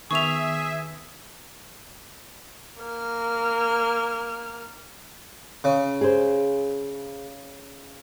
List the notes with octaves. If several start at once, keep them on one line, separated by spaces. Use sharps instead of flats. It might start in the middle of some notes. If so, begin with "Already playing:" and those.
D#3 B3 G#4 E5 C#6 F7
A#3 F6
C#3
G#4 C5